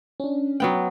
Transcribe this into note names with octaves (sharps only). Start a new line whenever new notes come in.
C#4 D4
F#3 B3 G5